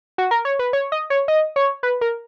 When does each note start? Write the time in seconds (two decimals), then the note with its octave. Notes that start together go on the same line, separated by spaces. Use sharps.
0.18 F#4
0.31 A#4
0.45 C#5
0.59 B4
0.73 C#5
0.92 D#5
1.10 C#5
1.28 D#5
1.56 C#5
1.83 B4
2.01 A#4